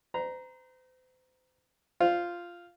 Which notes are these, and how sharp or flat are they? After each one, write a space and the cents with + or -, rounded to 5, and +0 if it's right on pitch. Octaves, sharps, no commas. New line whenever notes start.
C5 -40 A#5 +5
F4 -5 C5 +0